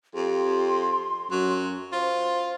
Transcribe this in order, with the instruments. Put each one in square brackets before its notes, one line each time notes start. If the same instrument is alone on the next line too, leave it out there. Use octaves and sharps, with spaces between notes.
[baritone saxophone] F2 [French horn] G4 [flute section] C6
[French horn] F#2 [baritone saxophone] F#3
[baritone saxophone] F4 [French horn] C5